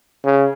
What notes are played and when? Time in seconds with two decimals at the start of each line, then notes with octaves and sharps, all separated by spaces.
0.25 C#3